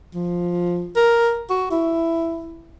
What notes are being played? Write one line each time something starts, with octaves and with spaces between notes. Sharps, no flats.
F3
A#4
F#4
E4